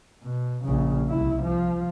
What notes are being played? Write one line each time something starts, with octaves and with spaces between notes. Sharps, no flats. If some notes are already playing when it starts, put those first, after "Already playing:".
B2
A#1 C#3
C2 E4
F3